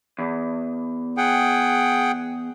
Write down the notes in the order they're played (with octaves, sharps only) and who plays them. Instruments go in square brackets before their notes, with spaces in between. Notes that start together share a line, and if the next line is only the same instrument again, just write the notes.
[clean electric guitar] E2
[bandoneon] G#4 F#5 G5